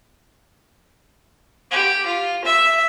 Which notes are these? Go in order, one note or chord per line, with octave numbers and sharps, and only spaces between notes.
G4
F4
E5